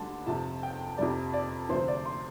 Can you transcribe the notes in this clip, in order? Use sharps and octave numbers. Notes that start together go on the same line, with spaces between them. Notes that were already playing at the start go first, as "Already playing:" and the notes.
Already playing: D2 D3 G3 A5 C6
F2 C3 F3 A5
G5
F2 C3 G3 D5
D5
D2 C3 F3 C5
D5
C6